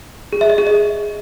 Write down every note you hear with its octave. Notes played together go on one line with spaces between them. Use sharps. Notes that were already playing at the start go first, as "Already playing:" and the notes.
G#4
E5
D#5
G#4
D#5